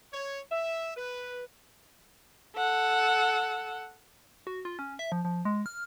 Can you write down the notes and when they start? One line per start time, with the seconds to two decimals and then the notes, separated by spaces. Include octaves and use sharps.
0.12 C#5
0.52 E5
0.97 B4
2.57 A4 F#5
4.47 F#4
4.65 F4
4.79 C#4
4.99 E5
5.12 F3
5.25 F3
5.45 G#3
5.66 F6